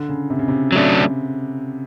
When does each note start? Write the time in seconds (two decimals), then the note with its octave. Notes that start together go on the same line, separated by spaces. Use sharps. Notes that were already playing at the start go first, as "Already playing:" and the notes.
Already playing: D3
0.09 C#3
0.30 C3
0.39 C#3
0.48 C3
0.72 F#3 A3 D4